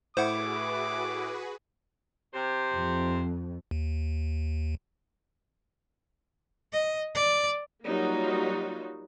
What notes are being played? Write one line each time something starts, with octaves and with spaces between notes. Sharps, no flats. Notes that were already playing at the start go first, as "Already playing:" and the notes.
A2 E4 F#4 G#4 B4 C5 F#5 D6
C3 C5
F2
D#2
D#5
D5
F#3 G3 A#3 D#4 F4 F#4